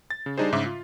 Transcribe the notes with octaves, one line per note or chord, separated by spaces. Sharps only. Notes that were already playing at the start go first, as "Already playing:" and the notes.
A6
C#3
G3 D4 D#4 G#4 C5
G#2 C#3 E5 D6
F4